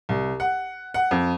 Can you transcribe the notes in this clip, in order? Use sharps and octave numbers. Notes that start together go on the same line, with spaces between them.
C2
F#5
F#5
F2